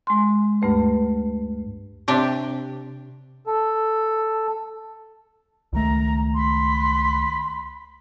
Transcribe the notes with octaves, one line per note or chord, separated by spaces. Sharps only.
G#3 C6
D2 G2 A3 B4
C3 D4 G4
A4
C#2 D#3 A3 A#5
B5 C6